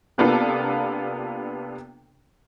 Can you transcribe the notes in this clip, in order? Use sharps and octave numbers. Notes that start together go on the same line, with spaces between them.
C3 A#3 B3 D4 F4 A4